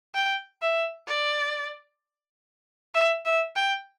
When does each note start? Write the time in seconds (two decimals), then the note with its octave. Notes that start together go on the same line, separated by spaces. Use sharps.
0.15 G5
0.62 E5
1.08 D5
2.94 E5
3.26 E5
3.56 G5